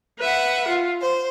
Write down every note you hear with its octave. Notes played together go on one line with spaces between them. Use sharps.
B4 E5 F#5
F4
C5